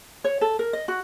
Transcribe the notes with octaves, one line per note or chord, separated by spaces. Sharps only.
C#5
A4
A#4
D#5
F#4